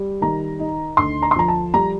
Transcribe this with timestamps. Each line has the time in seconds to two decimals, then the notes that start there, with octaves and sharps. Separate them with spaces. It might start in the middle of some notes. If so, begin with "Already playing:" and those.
Already playing: G3
0.21 D#3 A#5
0.60 D#4
0.97 D2 C6
1.22 A#5
1.31 C6
1.36 F3 A#5
1.48 A5
1.74 G3 A#5